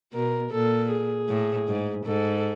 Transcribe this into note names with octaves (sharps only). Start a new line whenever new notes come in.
B2 A#4
A#2 A4
G#4
A2
G#2
G#2 A4